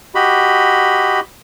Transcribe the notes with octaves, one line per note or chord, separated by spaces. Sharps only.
F#4 G4 D#5 B5